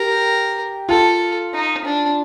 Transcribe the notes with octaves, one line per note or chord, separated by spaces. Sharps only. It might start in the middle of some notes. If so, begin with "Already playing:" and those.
Already playing: G4 A#4
F4 A4
D#4
D4